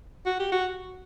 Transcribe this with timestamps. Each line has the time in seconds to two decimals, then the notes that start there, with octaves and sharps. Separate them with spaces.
0.26 F#4
0.39 G4
0.52 F#4